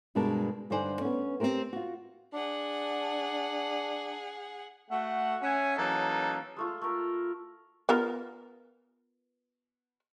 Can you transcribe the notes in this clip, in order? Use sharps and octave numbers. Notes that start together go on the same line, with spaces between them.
G2 B2 G#3 D4 A#4 A5
G2 D3 D#4 C5 D5 G#5
B3 C#4
C4 D4 G4 A#4 C5
F4 F#4
D4 G#4 F#5
A3 F#4 F#5
C#4 C#5 E5 F#5 G#5
E3 F#3 A#3 C#4 D#4 A4
G#3 A3 F4
A3 A#4
B3 F4 A#4